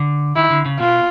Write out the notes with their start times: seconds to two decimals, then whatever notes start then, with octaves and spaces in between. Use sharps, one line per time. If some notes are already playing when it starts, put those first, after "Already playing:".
Already playing: D3
0.36 D#3 E4
0.50 D3
0.65 C#3
0.80 B2 F4